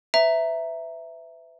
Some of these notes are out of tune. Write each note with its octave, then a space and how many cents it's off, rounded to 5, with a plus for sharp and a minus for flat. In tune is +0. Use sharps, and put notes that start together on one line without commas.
B4 +40 E5 +0 A#5 +0